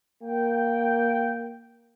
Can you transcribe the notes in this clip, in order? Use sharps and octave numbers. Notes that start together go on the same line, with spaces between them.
A#3 G5